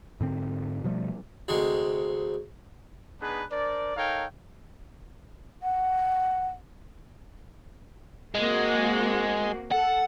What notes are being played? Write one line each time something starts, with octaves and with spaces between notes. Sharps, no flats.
G#2 D3 C4
B2 F3 G3 A3
D2 C3 G#3
B3 D4 D#4 G#4 B4
D4 A#4 C5 D5
D#4 A4 A#4 C#5 F5 G5
F#5
G#3 A#3 C4 F#4
A4 F#5